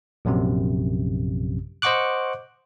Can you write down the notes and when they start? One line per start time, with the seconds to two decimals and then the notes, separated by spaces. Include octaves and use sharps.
0.25 A#1 F#2 C3
1.82 C5 D#5 F#5 C#6 D6 F#6